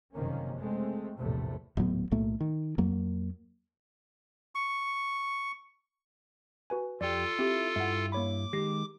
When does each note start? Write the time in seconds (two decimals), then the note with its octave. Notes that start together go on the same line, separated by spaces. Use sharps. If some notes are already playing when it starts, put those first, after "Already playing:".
0.13 F#1 F2 C3 D#3 A#3 C#4
0.59 G#3 A3 C4
1.18 A#1 E2 A2 C3 A3
1.77 D#1 A2 F#3 B3
2.11 B1 A2 A3 A#3
2.40 D#3
2.78 F2 F#3 A#3
4.55 C#6
6.70 F#4 B4 G#5
7.01 F2 F4 G4 A4 D5
7.39 C4 E4 G4
7.76 G2 E4 E5 F#5
8.12 A#3 C#5 B5 D6
8.53 D#3 G#3 G4 A#6 C7